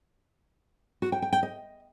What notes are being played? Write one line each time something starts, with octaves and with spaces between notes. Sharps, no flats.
F#4
G5
G5
G5
D#5